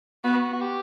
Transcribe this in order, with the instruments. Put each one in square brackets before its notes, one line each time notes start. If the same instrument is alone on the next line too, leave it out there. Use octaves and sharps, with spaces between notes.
[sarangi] B3 [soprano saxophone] F#4
[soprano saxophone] F#4
G4